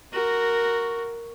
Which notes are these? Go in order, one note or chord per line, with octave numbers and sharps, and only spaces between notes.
F#4 A#4